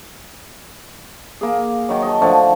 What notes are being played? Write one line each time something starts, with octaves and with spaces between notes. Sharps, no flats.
A#3 G#4
D#3 F#3
D#5 A5
D3 F3 A3